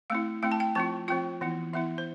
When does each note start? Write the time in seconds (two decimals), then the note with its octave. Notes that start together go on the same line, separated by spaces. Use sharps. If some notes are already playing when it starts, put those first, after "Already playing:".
0.10 A3 C4 E4 F5
0.43 A3 C4 E4 G5
0.52 A5
0.60 G5
0.75 F3 C4 F4 A5
1.08 F3 C4 F4 G5
1.41 E3 B3 E4
1.73 E3 B3 E4 E5
1.98 C5